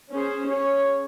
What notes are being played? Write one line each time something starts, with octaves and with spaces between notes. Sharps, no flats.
C#4 G#4 C5
C#4 G#4 C#5